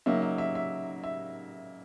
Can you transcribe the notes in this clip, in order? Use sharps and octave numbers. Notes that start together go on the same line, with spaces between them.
C#3 F#3 A#3 D#4 E5
E5
E5
E5
E5